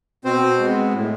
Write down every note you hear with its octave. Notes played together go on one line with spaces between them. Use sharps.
B2 C4 C5
G#3 B3
A2